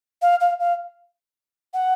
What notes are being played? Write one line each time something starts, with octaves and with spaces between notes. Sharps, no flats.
F5
F5
F5
F#5